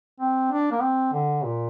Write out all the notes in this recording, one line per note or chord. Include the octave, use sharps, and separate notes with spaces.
C4
D4
A#3
C4
D3
A#2